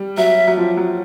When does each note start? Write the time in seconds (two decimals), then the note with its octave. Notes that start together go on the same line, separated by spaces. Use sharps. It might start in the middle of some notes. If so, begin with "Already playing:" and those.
Already playing: G3
0.17 F#3 E5
0.47 F#3
0.57 F3
0.77 F#3